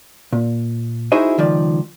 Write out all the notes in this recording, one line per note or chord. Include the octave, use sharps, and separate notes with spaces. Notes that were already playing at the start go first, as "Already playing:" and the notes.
A#2
D#4 E4 F#4 G#4 C5 D#5
C#2 D#3 F3 D5